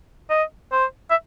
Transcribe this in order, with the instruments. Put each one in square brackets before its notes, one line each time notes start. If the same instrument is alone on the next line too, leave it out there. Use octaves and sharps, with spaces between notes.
[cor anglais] D#5
C5
E5